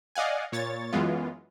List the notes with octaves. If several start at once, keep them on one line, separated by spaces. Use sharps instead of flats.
D5 D#5 F5 F#5 G#5
A#2 C#5 A6
F#2 E3 G#3 B3 F4